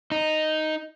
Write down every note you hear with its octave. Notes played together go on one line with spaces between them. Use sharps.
D#4